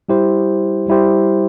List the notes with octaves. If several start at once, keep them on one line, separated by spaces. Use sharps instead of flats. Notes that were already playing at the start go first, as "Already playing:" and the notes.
G3 E4 G4 C5
G3 E4 G4 C5